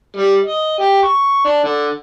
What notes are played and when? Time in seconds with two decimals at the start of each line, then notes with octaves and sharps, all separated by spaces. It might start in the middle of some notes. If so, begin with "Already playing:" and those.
0.17 G3
0.44 D#5
0.79 G4
1.03 C#6
1.45 D4
1.64 D3